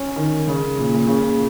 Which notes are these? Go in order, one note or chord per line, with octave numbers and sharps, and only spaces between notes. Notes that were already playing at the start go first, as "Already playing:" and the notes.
Already playing: C#4
D#3
C#3
A#2
A#2
C#3
A#2